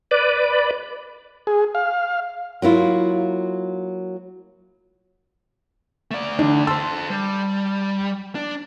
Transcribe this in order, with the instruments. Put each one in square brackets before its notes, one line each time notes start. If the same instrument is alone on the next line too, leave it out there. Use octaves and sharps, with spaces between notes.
[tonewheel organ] B4 D5
[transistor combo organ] G#4
F5
[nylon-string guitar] F#3 A#3 E4 F4
[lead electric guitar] A3 D5
[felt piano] D3 D4
[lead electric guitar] A4 C5 [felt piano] A5 C6 E6
[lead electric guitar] G3
D4